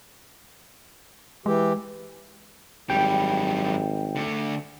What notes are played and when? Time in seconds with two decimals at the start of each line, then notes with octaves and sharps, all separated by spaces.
1.46 E3 G#3 G4
2.90 G#1 F#2 G3 G5
4.16 D3 A3